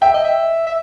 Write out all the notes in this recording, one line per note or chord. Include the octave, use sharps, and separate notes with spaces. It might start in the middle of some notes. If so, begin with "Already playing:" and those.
E5 G5
D#5
E5
E5